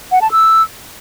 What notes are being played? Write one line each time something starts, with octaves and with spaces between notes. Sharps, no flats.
F#5
A5
E6